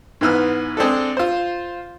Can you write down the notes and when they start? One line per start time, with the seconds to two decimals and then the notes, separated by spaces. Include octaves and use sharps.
0.21 G#2 E3 B3 E6 F6
0.77 G#3 C4 D4 A4
1.17 F4 C5